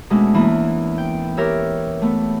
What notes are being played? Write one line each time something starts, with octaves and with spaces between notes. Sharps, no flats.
B2 G#3 A3 C#4 D4
E2 E3 A#3 E4
G5
G4 A#4 C#5 E5
A3 B3